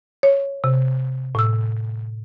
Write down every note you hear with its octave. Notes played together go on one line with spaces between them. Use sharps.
C#5
C3
A2 E6